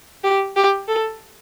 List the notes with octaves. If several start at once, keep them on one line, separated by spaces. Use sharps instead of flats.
G4
G4
A4